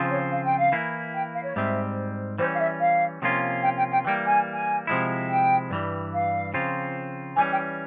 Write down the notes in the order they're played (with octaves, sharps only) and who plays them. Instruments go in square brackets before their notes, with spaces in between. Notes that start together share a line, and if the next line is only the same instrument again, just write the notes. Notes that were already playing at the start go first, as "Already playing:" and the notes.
Already playing: [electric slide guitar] C#3 F3 C4 F4
[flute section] C#5
F5
G5
F5
[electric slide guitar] E3 A#3 E4
[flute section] G5
F5
C#5
[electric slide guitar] G#2 G3 C4 [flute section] E5
[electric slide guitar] E3 G3 A#3 C#4 [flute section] C5
[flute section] F5
E5
F5
[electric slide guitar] C3 F3 A#3 C#4 F4
[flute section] G5
G5
G5
[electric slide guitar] E3 [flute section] G5
[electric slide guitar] G3 A#3
[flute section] G#5
G#5
[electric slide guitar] C3 F3 G#3 E4
[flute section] G5
[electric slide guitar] G2 E3 G3
[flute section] F5
[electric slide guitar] C#3 F3 C4 F4
[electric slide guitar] E3 G3 C#4 [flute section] G#5
[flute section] G5